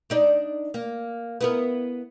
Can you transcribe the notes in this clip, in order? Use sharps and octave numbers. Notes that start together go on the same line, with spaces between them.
D4 D#4 D5
A#3
B3 E4 A#4